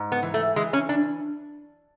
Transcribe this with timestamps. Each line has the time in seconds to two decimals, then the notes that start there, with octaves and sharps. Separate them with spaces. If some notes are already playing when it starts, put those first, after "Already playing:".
Already playing: G#2
0.12 B3
0.23 E3
0.34 A3
0.56 E3 G#3
0.73 C#4
0.89 D4